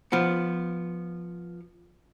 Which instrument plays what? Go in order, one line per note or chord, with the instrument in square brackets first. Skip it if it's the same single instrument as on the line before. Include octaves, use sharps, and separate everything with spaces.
[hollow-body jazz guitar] F3 B3